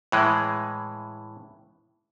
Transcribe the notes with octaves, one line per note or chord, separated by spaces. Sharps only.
A2 E3 G#3